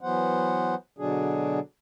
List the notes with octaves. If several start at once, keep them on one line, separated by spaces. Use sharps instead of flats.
E3 F#3 B3 C5 F#5
B2 D3 F#3 D4 G#4